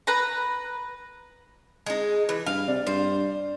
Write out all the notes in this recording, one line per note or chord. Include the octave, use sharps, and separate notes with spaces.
B4 A#5
G#3 D#4
E3
G2 F5
C3 D5
G2 C5